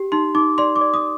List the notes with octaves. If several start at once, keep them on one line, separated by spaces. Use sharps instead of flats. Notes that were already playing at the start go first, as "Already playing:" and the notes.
Already playing: G4
D#4 C6
D#4 D6
D5 C6
D6
D5
D#6